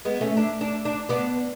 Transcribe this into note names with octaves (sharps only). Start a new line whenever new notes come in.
G#3 B3
A3 C#4
D4
D4
D4
B3 D4